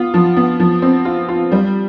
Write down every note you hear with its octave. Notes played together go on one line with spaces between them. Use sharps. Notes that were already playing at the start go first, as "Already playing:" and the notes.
Already playing: B3 F4
F3
B3
F3
C4
F4
F4
G3